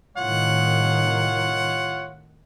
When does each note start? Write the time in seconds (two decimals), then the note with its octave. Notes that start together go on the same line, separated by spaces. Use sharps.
0.17 C2 A2 D#3 F4 C#5 F#5